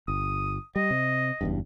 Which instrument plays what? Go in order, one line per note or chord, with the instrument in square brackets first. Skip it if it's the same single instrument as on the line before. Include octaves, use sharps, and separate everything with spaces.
[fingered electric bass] G1 [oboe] D#6
[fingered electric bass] G3 [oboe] D#5
[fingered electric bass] C3
F#1 E2 G2